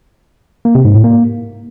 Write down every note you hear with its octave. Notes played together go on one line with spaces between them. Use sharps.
A#3
C3
G#2
A2
A#3